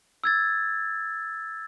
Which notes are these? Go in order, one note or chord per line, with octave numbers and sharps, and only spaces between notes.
E6 G#6 A6